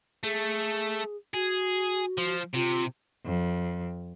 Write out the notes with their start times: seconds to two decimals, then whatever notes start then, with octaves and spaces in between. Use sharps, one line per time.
0.23 A3 G#4
1.34 F#4 G#4
2.18 F3
2.54 C3 F4
3.25 F2